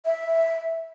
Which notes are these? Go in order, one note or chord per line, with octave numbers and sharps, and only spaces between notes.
E5